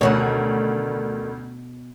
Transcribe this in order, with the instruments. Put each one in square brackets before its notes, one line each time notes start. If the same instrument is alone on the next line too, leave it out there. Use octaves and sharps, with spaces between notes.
[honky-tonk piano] A1 D2 [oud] B2 C#5 [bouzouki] D3 D#3 F#4